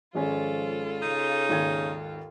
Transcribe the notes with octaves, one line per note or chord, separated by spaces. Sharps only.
G#1 F3 G#3 C#4 F4 A4
C#3 D#4
G#1 D#2 G#6